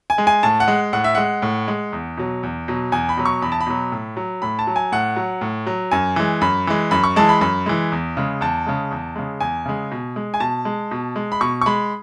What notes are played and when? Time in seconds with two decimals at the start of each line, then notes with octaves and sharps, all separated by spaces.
0.10 G#5
0.18 G#3
0.27 G#5
0.43 A2 A5
0.60 F#5
0.68 G#3
0.93 A2 F#5
1.04 E5
1.15 G#3 F#5
1.42 A2
1.68 G#3
1.93 E2
2.17 B2 F#3
2.43 E2
2.68 B2 F#3
2.92 E2 G#5
3.09 B5
3.17 B2 F#3
3.25 C#6
3.42 E2 B5
3.52 A5
3.61 B5
3.67 B2 F#3
3.92 A2
4.17 F#3
4.42 A2 B5
4.59 A5
4.67 F#3
4.76 G#5
4.92 A2 F#5
5.16 F#3
5.41 A2
5.67 F#3
5.91 F#2 G#5
6.16 E3 G#3
6.41 F#2 B5
6.67 E3 G#3
6.91 F#2 B5
7.04 C#6
7.16 E3 G#3 A5
7.29 B5
7.41 F#2 B5
7.66 E3 G#3
7.92 E2
8.17 C#3 G#3
8.41 E2 A5
8.66 C#3 G#3
8.91 E2
9.16 C#3 G#3
9.40 E2 G#5
9.66 C#3 G#3
9.92 B2
10.16 G#3
10.34 G#5
10.40 B2 A5
10.65 G#3
10.91 B2
11.16 G#3
11.32 B5
11.41 B2 C#6
11.61 C#6
11.66 G#3 B5